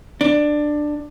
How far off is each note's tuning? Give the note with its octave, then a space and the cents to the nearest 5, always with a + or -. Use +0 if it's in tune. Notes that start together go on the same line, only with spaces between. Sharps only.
D4 +15